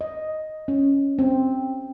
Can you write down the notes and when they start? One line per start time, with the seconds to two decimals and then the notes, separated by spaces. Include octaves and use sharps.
0.01 D#5
0.68 C#4
1.19 C4